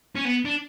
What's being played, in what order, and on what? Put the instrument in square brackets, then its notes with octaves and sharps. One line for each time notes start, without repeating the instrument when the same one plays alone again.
[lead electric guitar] C#4
B3
D4